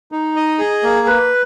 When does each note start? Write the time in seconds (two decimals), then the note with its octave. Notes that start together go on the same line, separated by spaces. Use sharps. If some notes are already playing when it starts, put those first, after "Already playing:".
0.12 D#4
0.36 D#5
0.59 G#4
0.83 A#3
1.07 B4